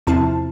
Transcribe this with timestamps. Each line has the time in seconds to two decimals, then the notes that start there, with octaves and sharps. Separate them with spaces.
0.07 E2 C3 F3 C4 E4 A5